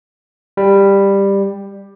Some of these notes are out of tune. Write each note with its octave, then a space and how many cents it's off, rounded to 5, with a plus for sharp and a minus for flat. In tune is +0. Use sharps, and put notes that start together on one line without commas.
G3 +10